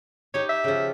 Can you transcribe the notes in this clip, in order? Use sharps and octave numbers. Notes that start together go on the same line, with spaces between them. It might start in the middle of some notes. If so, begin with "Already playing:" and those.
D#4 G4 C#5
E5
C#3 F3